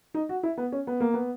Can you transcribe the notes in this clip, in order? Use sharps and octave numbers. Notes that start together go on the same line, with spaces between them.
D#4
F#4
E4
B3
C#4
B3
A#3
B3